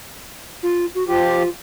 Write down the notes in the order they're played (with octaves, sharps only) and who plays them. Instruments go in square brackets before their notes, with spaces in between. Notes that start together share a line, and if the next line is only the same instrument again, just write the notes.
[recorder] F4
F#4
[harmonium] F3 G4 [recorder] F4